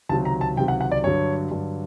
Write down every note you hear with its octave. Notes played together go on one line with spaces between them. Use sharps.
C#2 C3 D#3 F#3 A5
A#5
A5
C#2 C3 D#3 F#3 G5
F#5
F#5
D5
G2 D3 F#3 C#5
G2 D3 F#3